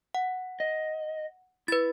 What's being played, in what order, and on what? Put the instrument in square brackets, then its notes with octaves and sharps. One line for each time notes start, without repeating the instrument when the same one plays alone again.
[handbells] F#5
[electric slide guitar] D#5
[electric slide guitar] E4 [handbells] B4 A6